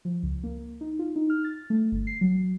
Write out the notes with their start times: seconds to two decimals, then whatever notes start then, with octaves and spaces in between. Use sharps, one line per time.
0.05 F3
0.23 C#2
0.44 A#3
0.81 D#4
0.99 F4
1.16 D#4
1.30 F6
1.44 A6
1.70 A3
1.92 G1
2.07 C7
2.21 F#3